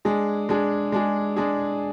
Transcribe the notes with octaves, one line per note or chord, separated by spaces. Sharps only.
G#3 D4 G#4
G#3 D4 G#4
G#3 D4 G#4
G#3 D4 G#4